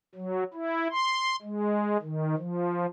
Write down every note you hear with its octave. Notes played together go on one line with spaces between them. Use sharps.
F#3
E4
C6
G#3
D#3
F3